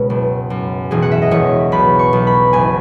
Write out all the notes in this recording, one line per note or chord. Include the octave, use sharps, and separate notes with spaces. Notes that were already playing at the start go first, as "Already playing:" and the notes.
Already playing: C#2 B2
F#1
F#2
E1 G#4
F#5
E5
D#5
E1 C#5
B1 B5
C#6
B1
B5
F#1 G#5